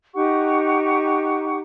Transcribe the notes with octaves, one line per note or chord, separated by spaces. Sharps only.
D#4 G4 F#5 C#6